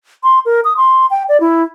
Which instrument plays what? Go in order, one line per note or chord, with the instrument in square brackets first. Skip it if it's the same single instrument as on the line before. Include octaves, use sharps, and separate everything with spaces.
[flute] C6
A#4
D#6
C6
G5
D5
E4